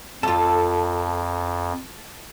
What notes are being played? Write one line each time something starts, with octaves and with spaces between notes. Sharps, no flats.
F2 F4 A4 A5